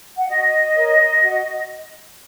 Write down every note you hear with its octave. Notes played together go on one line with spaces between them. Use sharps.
F#5
F#4 D#5
A#4 C#5
F#4